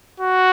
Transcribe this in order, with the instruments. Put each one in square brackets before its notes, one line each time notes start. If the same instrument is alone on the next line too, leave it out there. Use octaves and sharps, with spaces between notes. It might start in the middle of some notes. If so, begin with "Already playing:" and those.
[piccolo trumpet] F#4